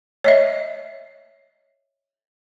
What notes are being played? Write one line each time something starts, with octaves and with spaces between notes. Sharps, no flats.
C#5 D#5 E5